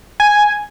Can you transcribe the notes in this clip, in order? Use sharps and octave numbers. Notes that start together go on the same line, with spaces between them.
G#5